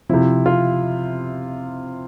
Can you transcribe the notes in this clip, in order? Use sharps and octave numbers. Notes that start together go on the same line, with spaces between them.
C3 F3 E4
F4